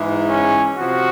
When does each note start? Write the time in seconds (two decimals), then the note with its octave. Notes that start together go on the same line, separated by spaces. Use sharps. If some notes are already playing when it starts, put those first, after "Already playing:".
Already playing: G#2 E3 G#3
0.29 C#4
0.78 C3 F3 F#4